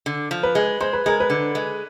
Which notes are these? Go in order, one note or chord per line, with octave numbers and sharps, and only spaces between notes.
D3
F3
B4
G#3
G#3 C5
B4
G#3 A#4
B4
D3
G#3